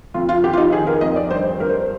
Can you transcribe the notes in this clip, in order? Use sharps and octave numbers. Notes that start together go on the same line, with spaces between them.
F2 F4
F4
F2 G4
F4
D#4
D#3 G#4
A#4
F2 D#5
D5
G2 C5
G2 A#4
C5